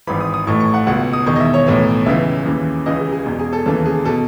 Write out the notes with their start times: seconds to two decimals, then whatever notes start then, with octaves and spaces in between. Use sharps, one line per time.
0.07 G#1 G#2 E3 B5
0.20 D#6
0.34 D#6
0.47 A1 A2 E3 C#6
0.60 C#6
0.74 F#5
0.87 C#2 B2 F#5
1.13 D#6
1.26 E1 E2 D#3 C#6
1.36 D#5
1.40 E5
1.54 C#5
1.66 B1 A2 E3
2.06 C#2 C#3 E3 E5
2.46 D#2 C#3 E3
2.86 C#2 C#3 E3 D#5
2.99 G#4
3.13 G#4
3.26 E1 E2 B2
3.39 G#4
3.53 A4
3.66 D#2 C#3 E3 A4
3.86 G#4
4.05 B2 A4